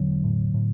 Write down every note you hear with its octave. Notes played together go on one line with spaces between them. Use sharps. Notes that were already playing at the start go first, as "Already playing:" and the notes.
Already playing: E1 D3 F#3
A2
A2